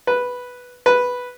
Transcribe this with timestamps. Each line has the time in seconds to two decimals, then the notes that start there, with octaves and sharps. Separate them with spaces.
0.07 B4
0.86 B4